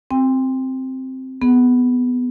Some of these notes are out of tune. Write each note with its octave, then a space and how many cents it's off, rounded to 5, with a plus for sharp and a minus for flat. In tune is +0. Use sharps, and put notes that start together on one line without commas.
C4 +0 F#4 +0 G5 +35
B3 +10 G#4 +0